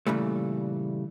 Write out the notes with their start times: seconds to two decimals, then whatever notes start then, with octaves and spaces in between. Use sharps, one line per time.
0.07 A#2 C#3 E3 G3 A3